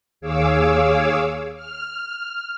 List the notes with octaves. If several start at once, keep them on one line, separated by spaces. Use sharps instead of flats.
D#2 G#4 C#5 F5 D6 E6
F6